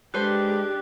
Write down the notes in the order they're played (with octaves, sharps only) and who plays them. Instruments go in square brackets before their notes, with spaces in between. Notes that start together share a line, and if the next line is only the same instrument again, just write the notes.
[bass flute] G#3 [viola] D4 G4 [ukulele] A4 B4 C5 [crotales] F#6